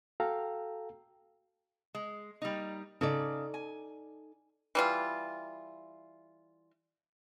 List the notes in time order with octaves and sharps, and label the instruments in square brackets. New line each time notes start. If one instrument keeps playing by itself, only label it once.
[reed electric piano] F#4 A4 F5 G5 A#5 E6
[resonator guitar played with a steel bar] G#3
G3 A#3 D#4
[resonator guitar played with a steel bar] C#3 [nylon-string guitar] D#4 A4 D5
[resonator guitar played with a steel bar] G#5
[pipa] E3 G3 F4